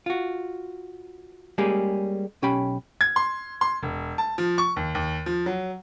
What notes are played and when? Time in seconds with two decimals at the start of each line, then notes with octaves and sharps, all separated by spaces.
0.06 F4 F#4
1.58 G3 G#3 A#3 C#4 G4 G#4
2.42 B1 C#4 G4 G5 B5
3.01 G#6
3.16 C6
3.61 C6
3.83 E1
4.18 A5
4.38 F3
4.58 C#6
4.76 D#2
4.95 D#2
5.26 F3
5.46 F#3